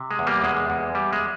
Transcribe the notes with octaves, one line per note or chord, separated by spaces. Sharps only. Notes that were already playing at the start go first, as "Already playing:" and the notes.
Already playing: C3
G#3
E2
G3 A#3
E2 G#3
E2
G3
G#3